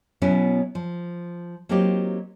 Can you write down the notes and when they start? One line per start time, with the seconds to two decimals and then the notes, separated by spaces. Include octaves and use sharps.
0.22 B2 F#3 B3 C#4 E4
0.75 F3
1.69 F#3 A#3 C4 D#4 F4 G4